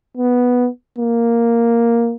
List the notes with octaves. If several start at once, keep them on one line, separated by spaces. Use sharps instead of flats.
B3
A#3